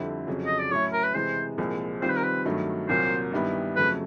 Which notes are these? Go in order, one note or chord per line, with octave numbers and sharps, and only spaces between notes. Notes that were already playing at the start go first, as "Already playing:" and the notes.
Already playing: F2 D3 G3 C4 E4
F2 C#3 F#3
D#5
D5
A2 F#3 A3 C#4 E4 C#5
A#4
B4
C3 E3 G#3 C5
C2 A#2 F3 G#3
D#3 G3 C4 F4 C5
B4
A#4
B4
G2 D#3 F#3 A3
C2 A#2 F#3 A#3 C5
G2 D#3 G3 B3 E4
F2 C#3 F#3 A3 B4